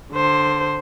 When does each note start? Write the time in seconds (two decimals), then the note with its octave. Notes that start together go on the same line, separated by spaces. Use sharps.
0.13 D3 C5